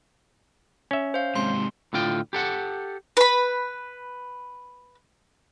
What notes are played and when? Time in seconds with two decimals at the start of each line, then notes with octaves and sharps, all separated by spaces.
0.91 C#4 E5
1.14 C5 F5
1.36 G#2 C3 C6
1.93 A2 D3 F4 G5
2.33 G4 A4 F#5
3.17 B4 B5